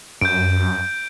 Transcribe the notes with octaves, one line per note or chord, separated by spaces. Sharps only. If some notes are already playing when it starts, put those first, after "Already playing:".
F#2 G6 D7